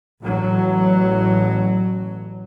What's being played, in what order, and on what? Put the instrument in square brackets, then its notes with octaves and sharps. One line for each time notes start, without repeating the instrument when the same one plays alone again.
[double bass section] A1 F#3